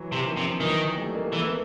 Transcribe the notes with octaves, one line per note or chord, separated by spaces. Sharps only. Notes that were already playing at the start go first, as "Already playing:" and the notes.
Already playing: E3 F#3
C3
D#3 F3
C3
D#3 E3 F#3
G3 A3
G#3 A#3
E3 A3 B3
A#3
A3 B3